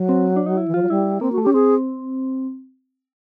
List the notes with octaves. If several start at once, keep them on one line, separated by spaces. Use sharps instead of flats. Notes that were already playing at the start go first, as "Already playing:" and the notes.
Already playing: F#3
C4
D4
D#4
E4
E3
F3 F4
F#3
G3 E4
A#3 C4
F#4
A3
C#4 G4
C4 G#4